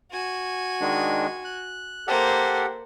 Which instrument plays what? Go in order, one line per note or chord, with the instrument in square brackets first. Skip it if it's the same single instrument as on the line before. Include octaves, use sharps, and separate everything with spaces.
[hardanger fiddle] F#4 G#5
[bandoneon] D#3 G#3 D4
F#6
[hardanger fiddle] A#3 C5 [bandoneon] G4 A4 F#5